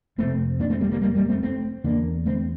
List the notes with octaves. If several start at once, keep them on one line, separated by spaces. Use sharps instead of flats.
F2 C3 A3 C4
A#3 D4
A3 C4
G3 A#3
G3 A#3
G3 A#3
G3 A#3
A3 C4
A3 C4
E2 D3 A#3 D4
A3 C4